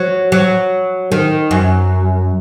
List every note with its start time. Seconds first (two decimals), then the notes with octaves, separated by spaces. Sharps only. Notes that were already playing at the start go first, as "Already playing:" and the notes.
Already playing: F#3
0.32 F#3
1.12 D#3
1.51 F#2